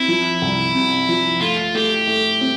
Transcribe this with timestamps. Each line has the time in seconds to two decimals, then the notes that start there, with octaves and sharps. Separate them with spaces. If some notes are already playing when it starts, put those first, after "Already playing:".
Already playing: C4 E4
0.08 F3
0.42 C2
0.75 C3
1.08 F3
1.41 A3 F4
1.75 A3 G4
2.07 A3
2.41 C4